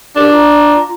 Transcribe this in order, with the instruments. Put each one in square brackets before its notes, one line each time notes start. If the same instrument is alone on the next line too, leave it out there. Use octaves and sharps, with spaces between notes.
[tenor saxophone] D4 [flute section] G4 A#4 D6
[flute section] F4 A#5